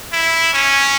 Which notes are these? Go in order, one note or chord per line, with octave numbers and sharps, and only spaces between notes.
E4
C#4